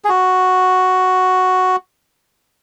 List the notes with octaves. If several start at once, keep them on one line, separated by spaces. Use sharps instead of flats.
G#4
F#4